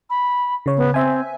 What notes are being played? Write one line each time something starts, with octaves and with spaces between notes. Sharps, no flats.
B5
C#3 C#5
B3
C4 E5 G#5